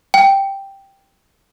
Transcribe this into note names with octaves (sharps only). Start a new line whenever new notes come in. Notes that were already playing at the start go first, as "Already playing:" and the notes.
G5